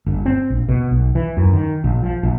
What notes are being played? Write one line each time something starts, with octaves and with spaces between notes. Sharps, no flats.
G1
C4
A#1
B2
B1
E3
F#2
D#3
A#1
F3
A#1